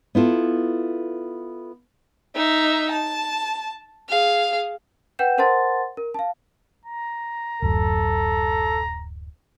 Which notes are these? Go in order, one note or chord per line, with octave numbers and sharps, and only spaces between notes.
B3 E4 F4 A4
D#4 E5
A5
G#4 F5
B4 F#5 G5 G6 E7
A#4 C5 F#5 A5 C6 A6
A#4
F5 A5
A#5
D1 F#2 A4